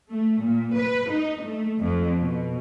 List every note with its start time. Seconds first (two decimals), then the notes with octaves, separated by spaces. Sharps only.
0.10 A3
0.41 A#2
0.77 B4
1.10 D#4
1.43 A3
1.81 F2
2.21 B2